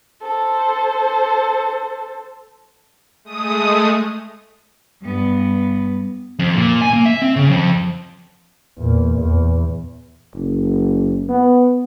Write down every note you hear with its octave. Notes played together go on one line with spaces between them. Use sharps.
A4 C5
G#3 A3 D#6
G2 B3
F2
A#2
G#5
A#3
E5
C4
C#3
F2
E2 A#2
E2
F#1
B3